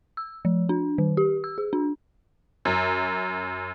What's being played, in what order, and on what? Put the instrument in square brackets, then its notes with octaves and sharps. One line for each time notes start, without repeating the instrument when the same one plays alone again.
[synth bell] E6
F3
D4
D#3
G4
E6
G#4
D4
[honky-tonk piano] F#2